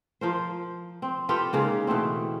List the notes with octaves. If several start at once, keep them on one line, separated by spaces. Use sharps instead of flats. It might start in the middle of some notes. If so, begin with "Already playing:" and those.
F3 A#4 C5
C4
F4 G4 A4 B4
G#2 C#3 A#3
B2 E3 A3 C4